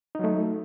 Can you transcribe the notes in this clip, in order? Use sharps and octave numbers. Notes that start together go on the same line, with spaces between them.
F#3 A3 D#4